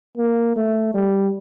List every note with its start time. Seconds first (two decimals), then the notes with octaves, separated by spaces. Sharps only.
0.17 A#3
0.56 A3
0.94 G3